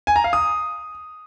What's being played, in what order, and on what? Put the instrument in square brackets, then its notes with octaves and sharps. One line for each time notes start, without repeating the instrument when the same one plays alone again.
[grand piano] G#5
A#5
F5
D#6